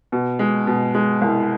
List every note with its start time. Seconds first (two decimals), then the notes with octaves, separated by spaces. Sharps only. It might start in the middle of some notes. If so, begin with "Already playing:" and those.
0.12 B2
0.39 G#3
0.67 B2
0.95 G#3
1.22 C2